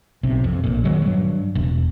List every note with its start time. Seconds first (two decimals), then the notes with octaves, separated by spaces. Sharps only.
0.23 B1 C3
0.44 F2
0.64 A#1 A#2
0.84 D#3 F#3 G#3
1.02 G2 F#3
1.55 E1